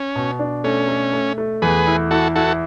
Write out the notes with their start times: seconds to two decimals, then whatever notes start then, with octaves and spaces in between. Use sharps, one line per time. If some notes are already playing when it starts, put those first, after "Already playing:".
Already playing: C#4
0.16 B2
0.39 D4
0.64 A3 C#4
0.89 A3
1.13 A3
1.38 A3
1.62 E2 G#4 B4
1.87 E4
2.11 E4 F#4 A4
2.36 E4 F#4 A4